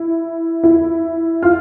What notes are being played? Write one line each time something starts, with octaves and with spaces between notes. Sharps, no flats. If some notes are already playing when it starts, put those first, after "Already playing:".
Already playing: E4
E4
F4